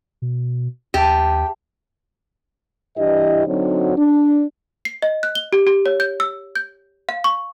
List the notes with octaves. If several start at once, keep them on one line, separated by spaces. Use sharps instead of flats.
B2
D#2 G4 E5 A5
G2 E3 E4 G4 D#5
D3 F#3 C4 D#4 F#4 C#5
D4
C7
D#5
F#6
G7
G4
G4
C#5
G6
E6
G6
F5
C#6